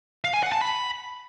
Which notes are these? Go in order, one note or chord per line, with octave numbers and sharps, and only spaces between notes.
F5
G#5
F#5
A5
B5